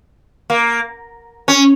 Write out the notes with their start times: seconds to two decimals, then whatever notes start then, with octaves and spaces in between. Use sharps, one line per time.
0.50 A#3
1.48 C#4